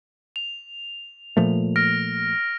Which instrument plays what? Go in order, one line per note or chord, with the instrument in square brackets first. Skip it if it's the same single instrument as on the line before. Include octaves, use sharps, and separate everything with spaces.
[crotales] F7
[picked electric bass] A#2 F3 A3
[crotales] F6 A#6 D7